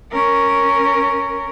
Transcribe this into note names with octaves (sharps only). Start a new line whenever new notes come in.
C#4 A#4